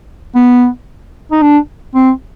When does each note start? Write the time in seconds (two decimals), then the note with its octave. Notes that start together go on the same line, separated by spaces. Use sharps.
0.35 B3
1.32 D#4
1.42 D4
1.95 C4